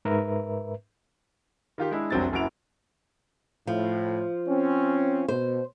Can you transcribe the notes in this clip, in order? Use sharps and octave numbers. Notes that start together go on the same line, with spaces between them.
G#2 A#4 B4 E5
D#3 F4 G4
G#3 D4 E4
F1 C2 F#3 C4 D4 A6
F#1 F#2 E4 F#4 D7 F7
A2 F3
C4 C#4
B2 C5